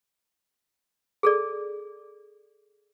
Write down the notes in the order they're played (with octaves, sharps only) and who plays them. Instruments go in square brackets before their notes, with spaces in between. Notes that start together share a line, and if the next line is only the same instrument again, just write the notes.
[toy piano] G#4 A4 D5